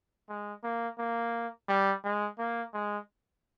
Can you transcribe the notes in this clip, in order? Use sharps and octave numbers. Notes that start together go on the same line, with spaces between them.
G#3
A#3
A#3
G3
G#3
A#3
G#3